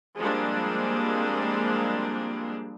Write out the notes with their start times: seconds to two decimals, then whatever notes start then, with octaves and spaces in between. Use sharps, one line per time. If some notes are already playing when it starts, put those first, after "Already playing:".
0.17 F3 G3 G#3 A#3 C4 D4